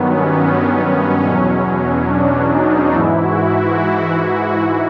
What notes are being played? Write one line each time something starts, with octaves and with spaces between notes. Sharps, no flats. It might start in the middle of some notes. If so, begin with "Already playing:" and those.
Already playing: G2 D#3 F#3 B3
C#4
E2 B2 F#3
D4
D#4
G#2 E3 E4
F#4
F#4